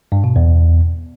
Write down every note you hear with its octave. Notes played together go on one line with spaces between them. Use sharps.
G2
B2
E2